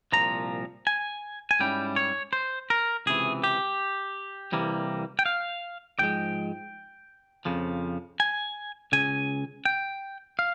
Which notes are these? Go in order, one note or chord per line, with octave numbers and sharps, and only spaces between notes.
C2 A#2 F3 A#5
G#5
G#5
G#2 G3 C#4 E4 G5
C#5
C5
A#4
C#2 C3 E3 G#4
G4
C2 C3 E3 G3 A#3
G5
F5
G#2 F3 G#3 G5
F2 C#3 F3
G#5
C#2 C#3 G#5
G5
F5